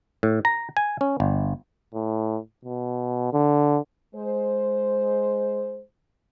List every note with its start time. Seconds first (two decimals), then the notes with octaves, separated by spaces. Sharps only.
0.23 A2
0.45 A#5
0.77 G#5
1.01 C#4
1.20 G1
1.94 A2
2.65 B2
3.33 D3
4.15 G#3 C5